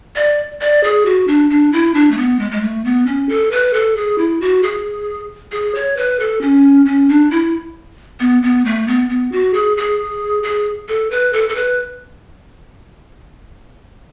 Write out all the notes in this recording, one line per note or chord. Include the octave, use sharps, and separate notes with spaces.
D5
D5
G#4
F#4
D4
D4
E4
D4
A3
B3
G#3
G#3
A3
B3
C#4
A4
B4
A4
G#4
E4
F#4
G#4
G#4
C#5
B4
A4
C#4
C#4
D4
E4
B3
B3
A3
B3
B3
F#4
G#4
G#4
G#4
A4
B4
A4
A4
B4